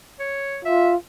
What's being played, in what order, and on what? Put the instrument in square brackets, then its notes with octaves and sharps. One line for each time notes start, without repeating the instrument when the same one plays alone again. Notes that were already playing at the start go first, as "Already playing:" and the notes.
[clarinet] C#5
[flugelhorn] F4 [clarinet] E5